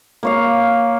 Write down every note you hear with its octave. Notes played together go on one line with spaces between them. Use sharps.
A#3 C#5 F5